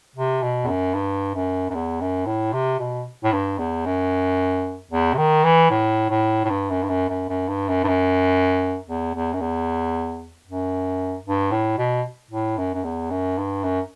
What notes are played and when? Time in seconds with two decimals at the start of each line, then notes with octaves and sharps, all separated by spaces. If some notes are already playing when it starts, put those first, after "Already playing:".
0.16 C3
0.42 B2
0.64 E2
0.68 F#2
0.94 G2
1.35 F#2
1.70 F#2
1.74 E2
2.01 F#2
2.26 A2
2.53 C3
2.79 B2
3.24 A2
3.32 G2
3.59 E2
3.86 F#2
4.91 E2
5.14 C3
5.18 D#3
5.44 E3
5.70 A2
6.10 A2
6.44 A2
6.50 G2
6.70 F#2
6.83 G2
6.89 F#2
7.09 F#2
7.29 F#2
7.48 G2
7.69 F#2
7.84 G2
7.88 F#2
8.88 E2
9.15 E2
9.33 F#2
9.40 E2
10.47 F#2
11.26 G2
11.51 A2
11.78 B2
12.31 A2
12.58 F#2
12.74 F#2
12.84 E2
13.10 F#2
13.38 G2
13.64 F#2